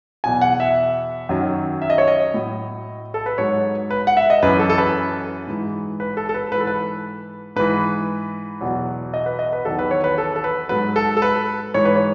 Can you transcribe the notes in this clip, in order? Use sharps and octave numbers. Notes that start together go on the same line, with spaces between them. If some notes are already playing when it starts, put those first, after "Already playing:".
E2 B2 F#3 G#5
F#5
E5
F#2 D#3 F#3
E5
D#5
C#5
D#5
A2 F#3
A4
B4
G#2 F#3 C#5
B4
F#5
E5
D#5
F#2 E3 B4
A4
A4
B4
G#2 E3
B4
A4
A4
B4
G#2 E3 A4 B4
B4
G#2 E3 B4
E2 B2 F#3
D#5
B4
D#5
B4
E2 D#3 F#3 A4
B4
C#5
B4
A4
A4
B4
G#2 F#3 B4
A4
A4
B4
G#2 E3 C#5
B4
C#5